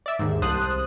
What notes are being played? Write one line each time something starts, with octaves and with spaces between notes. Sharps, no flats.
D5 E5
D#2 G#2
C2 C5 A5 D#6 F#6